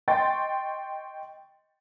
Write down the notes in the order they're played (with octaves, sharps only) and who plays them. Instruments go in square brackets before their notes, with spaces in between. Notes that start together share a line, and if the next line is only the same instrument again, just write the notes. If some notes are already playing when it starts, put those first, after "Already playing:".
[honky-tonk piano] D#5 G5 C6 C#6 A6